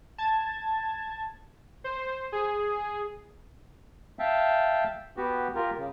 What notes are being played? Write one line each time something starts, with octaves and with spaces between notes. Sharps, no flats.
A5 G#6
C5
G#4
E5 F5 G5 A5
B3 F#4 G4
F4 G4 A#4
C#3